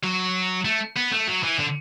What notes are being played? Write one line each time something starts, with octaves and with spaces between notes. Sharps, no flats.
F#3
A3
B3
A3
F#3
E3
D3